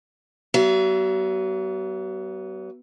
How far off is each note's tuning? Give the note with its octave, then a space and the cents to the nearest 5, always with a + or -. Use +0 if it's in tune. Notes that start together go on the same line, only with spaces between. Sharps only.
F#3 +45 B3 +0 E5 +40